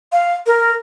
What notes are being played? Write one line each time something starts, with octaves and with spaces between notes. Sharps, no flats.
F5
A#4